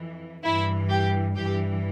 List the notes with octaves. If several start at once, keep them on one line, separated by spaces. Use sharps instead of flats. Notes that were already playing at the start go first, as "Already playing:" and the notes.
Already playing: F2 E3
G2 E3 E4
G4
G2 E3 G4